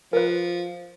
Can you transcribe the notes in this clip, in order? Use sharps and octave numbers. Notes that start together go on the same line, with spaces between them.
F3 A#4 B4